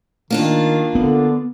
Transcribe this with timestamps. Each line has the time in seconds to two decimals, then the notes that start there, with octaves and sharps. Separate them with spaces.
0.31 D#3 A#3 D4 F4
0.95 D3 B3